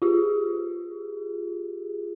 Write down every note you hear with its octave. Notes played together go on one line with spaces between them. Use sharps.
F4 G4 G#4